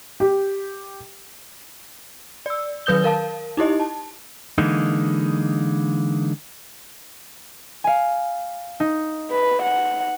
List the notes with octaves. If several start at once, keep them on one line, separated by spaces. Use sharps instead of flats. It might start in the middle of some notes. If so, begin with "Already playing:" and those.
G4
D5 E6
D#3 F#3 B4 D#6 G6 G7
A#4 F5 A5
D#4 E4 G4 D#5
A5
D3 E3 G#3 A#3 D#4
F5 G#5
D#4
B4
F#5